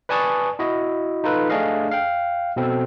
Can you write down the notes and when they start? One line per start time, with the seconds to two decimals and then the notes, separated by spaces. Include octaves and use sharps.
0.09 B4 D5 G#5 A5 C#6 D#6
0.59 E4 F#4 D#5
1.24 D#4 F4 A4 B4
1.50 A3 D4 G#4 D#5 F5
1.91 F5 G5
2.56 B2 C4 A4